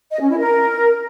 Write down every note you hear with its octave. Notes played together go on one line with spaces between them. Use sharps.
D#5
C#4
E4
A#4